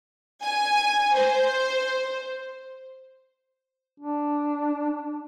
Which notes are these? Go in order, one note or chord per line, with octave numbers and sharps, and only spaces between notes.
G#5
C5
D4